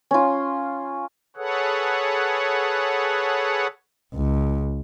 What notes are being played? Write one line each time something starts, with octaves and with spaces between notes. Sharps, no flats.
C#4 F4
G#4 A4 B4 C#5 F#5
C#2